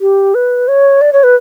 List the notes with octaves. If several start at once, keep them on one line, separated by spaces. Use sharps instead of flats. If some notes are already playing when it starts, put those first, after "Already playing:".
G4
B4
C#5
D5
C#5
B4